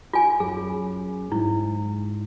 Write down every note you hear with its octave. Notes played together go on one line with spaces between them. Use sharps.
F4 G#5
F#2 G#4
G#2 E4